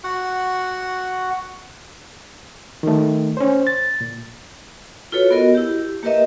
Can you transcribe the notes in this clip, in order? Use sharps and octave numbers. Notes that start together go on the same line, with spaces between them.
F#4 F#5
D#3 A3
C#4 C5
A6
A#2
F4 F#4 A4 B4 C#5
B3 F#4 A#4 D#5
E4 G4
A#3 G4 A#4 B4 D#5 E5